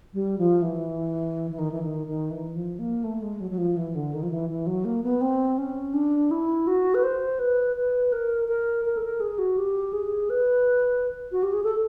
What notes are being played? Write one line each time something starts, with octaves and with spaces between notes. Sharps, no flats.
G3
F3
E3
E3
D#3
E3
D#3
D#3
E3
F3
A#3
A3
G#3
F#3
F#3
F3
E3
D3
D#3
F3
E3
E3
F#3
A#3
B3
C4
C#4
D4
E4
F#4
B4
C5
B4
B4
A#4
A#4
A#4
A4
A#4
G#4
F#4
G4
G#4
B4
F#4
G4
G#4
A4